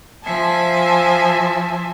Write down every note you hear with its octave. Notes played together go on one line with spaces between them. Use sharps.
F3 E5 G#5 A5